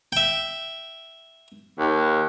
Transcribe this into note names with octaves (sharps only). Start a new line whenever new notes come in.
E5 G5
D#2